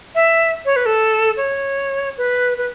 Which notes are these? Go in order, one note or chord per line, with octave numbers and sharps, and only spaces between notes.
E5
C#5
B4
A4
C#5
B4
B4